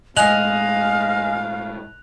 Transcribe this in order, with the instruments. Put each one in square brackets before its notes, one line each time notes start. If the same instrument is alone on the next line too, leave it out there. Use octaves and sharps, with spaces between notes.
[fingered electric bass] A2 G#3 [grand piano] D#5 G#5 [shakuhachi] F5 [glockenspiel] F#6 F7 F#7